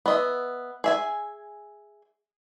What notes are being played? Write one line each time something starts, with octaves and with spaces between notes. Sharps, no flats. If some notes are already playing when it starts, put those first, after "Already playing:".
B3 D#5 E5
G#4 E5 G#5